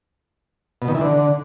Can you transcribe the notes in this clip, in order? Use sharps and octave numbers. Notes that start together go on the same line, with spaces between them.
B2
D#3
E3
D3